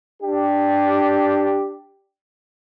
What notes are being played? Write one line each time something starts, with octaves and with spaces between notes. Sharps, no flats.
D4 G4